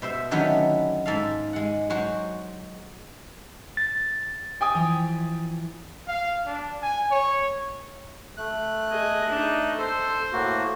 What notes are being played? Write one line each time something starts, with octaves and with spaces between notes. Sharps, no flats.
B2 C5 E5
D3 D#3 F#3 A3 B3 C#4
G#2 A4 F5
G#3 F#5
F#3 G#3 F#4 C5
A6
G5 G#5 D#6
E3 F3
F5
D4
G#5
C#5
A3 F#6
G#4 D#5
D4 D#4
A4 C5
A2 A#3 F#4